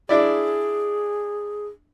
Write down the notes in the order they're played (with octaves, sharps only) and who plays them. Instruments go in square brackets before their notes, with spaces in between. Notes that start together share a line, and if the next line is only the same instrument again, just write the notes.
[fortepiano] D4 E4 D5 [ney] G#4